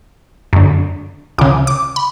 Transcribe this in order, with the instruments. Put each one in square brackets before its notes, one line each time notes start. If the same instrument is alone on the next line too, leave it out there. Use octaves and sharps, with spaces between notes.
[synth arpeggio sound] F#2 D3
C#2 C#3 D6
D6
B5